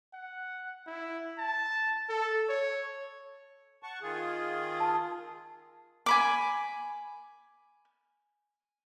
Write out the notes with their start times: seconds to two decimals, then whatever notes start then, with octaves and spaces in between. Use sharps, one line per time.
0.13 F#5
0.87 E4
1.38 A5
2.09 A4
2.49 C#5
3.83 F#5 A5 C#6
4.02 D#3 F4 G#4
4.77 A5 E6
6.06 G#5 B5 D6